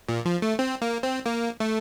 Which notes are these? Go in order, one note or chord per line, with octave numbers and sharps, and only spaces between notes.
A#2
F3
A3
C4
A#3
C4
A#3
A3